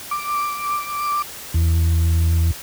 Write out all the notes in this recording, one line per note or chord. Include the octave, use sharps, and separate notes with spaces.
D6
E2